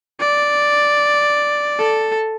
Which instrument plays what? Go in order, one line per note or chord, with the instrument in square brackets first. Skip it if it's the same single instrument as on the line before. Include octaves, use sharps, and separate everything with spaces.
[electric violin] D5
A4